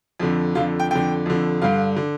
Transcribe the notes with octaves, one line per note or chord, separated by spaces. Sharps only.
F2 D3
F2 D3 F4
G5
F2 D3 G5
F2 D3
G2 D3 F5
D3